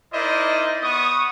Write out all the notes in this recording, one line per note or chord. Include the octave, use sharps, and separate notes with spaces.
D#4 E4 A#4 C5 D5 D#5
B3 C#6 D#6